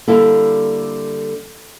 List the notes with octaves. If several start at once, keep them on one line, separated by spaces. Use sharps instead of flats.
D3 G3 A#3 E4 A4